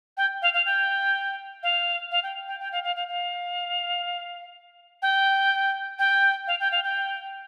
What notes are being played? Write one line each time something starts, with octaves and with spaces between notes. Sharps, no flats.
G5
F5
F5
G5
F5
F5
G5
G5
G5
F5
F5
F5
F5
G5
G5
F5
G5
F5
G5